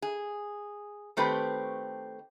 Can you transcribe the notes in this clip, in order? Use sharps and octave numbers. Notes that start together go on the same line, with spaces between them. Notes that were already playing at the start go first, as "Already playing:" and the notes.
G#4
D#3 A3 C4 G4 B4